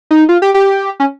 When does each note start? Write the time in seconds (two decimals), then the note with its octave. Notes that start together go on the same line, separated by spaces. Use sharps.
0.11 D#4
0.29 F4
0.42 G4
0.54 G4
1.00 C#4